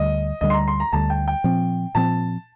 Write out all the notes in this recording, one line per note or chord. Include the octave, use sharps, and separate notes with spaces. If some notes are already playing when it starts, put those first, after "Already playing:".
Already playing: D2 D3 G3 D#5
D2 D3 G3 D#5
C6
A#5
C6
A#5
D2 D3 G3 A5
G5
G5
A#2 F3 C4
A#2 F3 C4 A5